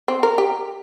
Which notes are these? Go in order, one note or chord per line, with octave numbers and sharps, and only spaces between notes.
C4
A#4
G4